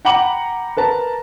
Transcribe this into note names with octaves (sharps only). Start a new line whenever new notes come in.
F#5 G5 A#5 B5 D6 F#7
A#4 B4 A5 A#5